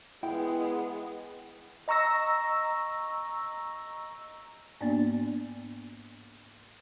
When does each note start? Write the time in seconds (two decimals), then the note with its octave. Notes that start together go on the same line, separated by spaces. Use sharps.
0.23 G#3 B3 E4 G5
1.88 D#5 A#5 C#6 E6 A#6
4.81 G#2 A#3 B3 D4 D5 A6